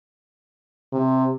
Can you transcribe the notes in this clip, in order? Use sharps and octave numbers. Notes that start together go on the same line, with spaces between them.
C3